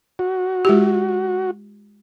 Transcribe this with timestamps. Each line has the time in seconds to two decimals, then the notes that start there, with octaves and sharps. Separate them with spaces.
0.19 F#4
0.65 G#3 F4 G4